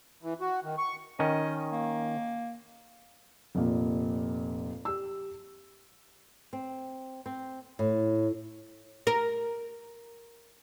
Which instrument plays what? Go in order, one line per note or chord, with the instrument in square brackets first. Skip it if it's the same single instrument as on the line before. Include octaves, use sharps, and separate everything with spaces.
[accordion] E3
F#4
D#3
C#6
[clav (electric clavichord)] D#3 C#4 [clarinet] D#5
[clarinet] A#3
[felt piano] F1 A#2
G4 E6
[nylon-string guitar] C4
C4
A2
[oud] A#4